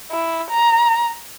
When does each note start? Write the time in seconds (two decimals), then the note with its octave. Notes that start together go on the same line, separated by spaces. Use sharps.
0.11 E4
0.51 A#5